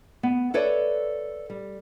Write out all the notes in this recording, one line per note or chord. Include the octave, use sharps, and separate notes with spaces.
B3
A4 B4 C#5 D5 E5 F#5
G3